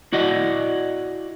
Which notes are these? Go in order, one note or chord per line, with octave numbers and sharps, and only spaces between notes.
E4 F#4 D5 D#5 F#5